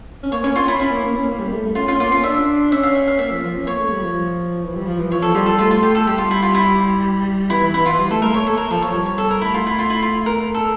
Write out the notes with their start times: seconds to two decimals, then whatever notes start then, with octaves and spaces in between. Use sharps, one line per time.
0.23 C#4
0.32 A#3 C#5
0.44 C#4 C#5
0.56 C#4 F4
0.68 E4
0.79 C#4 E4
0.91 A#3
1.04 A#3
1.16 C#4
1.28 A#3
1.39 G3
1.52 A3
1.63 A3
1.75 C#4 F4
1.88 C#4 F4
2.00 A#3 F4
2.12 C#4 F4
2.24 D4 E5
2.71 C#4 E5
2.83 F5
2.95 E5
3.08 F5
3.19 A#3 E5
3.31 F3
3.43 F3
3.56 C#4
3.67 A#3 C#5
3.80 A3
3.91 G3
4.03 F3
4.64 E3
4.75 G3
4.86 F3
4.99 E3
5.10 F3 C#5
5.22 A4
5.35 G3 F4
5.46 A4
5.59 A3 F4
5.71 F4
5.83 G4
5.95 A4
6.07 G3 G4
6.18 F4
6.31 E4
6.42 F4
6.55 E4
7.50 E3 E4
7.74 E4
7.86 F4
7.98 G3
8.11 A3 A4
8.22 A3 A#4
8.34 A3 C#5
8.46 A#3 A4
8.58 A#4
8.71 F3 A4
8.82 F3 C#5
8.94 G3
9.06 C#5
9.18 A4
9.31 A#4
9.41 A3 E4
9.54 F4
9.66 E4
9.79 F4
9.90 E4
10.02 F4
10.26 A#4
10.54 A4